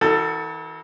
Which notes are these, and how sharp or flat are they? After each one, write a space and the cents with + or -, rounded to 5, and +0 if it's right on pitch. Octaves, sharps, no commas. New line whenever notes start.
E3 -40 F#4 +0 A4 +25